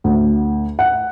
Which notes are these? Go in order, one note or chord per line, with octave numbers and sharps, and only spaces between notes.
D2
F#5